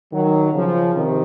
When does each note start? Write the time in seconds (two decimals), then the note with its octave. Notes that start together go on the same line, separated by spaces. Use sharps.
0.12 D#3 F#3
0.52 C#3 F3
0.93 C3 D#3